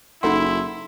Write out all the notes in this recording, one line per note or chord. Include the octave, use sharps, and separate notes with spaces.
F#1 D#4 E4 A4 F#5 C6